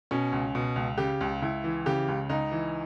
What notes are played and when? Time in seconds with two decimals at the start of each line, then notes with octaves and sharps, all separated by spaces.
0.11 B2 C#4
0.32 C#2
0.55 B2
0.76 C#2
0.98 C#3 G4
1.21 C#2
1.42 C#2 E4
1.64 E3
1.86 C#3 G4
2.08 C#2
2.29 C#2 D#4
2.52 E3